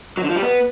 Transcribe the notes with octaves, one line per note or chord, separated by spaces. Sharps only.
F#3
D3
F3
G3
B3